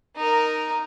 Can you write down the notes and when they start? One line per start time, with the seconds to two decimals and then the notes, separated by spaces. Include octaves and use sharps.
0.16 D#4 A#4